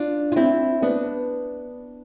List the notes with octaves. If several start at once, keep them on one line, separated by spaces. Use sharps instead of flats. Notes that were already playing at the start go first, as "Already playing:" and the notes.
Already playing: D4 F4
F4
C4 E4
B3 D4